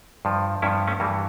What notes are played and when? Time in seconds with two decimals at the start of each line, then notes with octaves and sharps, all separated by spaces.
0.25 G2 F3
0.62 G2 F3 C#4 E4
0.87 A3 C#4
1.00 G2 E3 G3 A#3